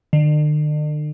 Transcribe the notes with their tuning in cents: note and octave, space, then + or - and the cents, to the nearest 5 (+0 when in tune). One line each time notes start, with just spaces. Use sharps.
D3 +45